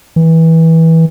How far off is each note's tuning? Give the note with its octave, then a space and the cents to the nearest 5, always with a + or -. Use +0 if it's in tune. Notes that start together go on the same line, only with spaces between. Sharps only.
E3 -20